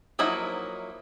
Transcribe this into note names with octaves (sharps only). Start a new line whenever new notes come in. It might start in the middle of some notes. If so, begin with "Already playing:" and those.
F3 F#3 A#3 D#4 E4